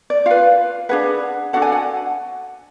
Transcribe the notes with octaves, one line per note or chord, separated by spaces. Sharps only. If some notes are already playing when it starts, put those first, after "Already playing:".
D5
F4 B4 F5
D4 G#4 B4 F#5
D4 F#4 A4 F#5
G#5
F#5